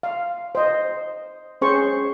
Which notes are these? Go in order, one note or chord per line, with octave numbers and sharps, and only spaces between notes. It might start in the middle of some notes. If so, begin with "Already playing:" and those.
F5
C5 D#5
C#4 G#4 C5 C#6